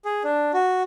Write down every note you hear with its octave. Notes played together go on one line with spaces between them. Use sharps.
G#4
D4
F#4